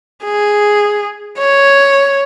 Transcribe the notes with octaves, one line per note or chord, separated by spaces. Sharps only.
G#4
C#5